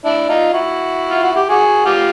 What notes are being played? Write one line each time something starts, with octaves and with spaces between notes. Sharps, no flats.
D4 E4
D#4 F4
E4 F#4
F4
F#4
G4
F#4 G#4
F4 G4